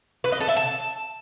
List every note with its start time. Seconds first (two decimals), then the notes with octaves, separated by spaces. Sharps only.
0.24 B4
0.32 D#5
0.40 A4
0.48 E5
0.56 A5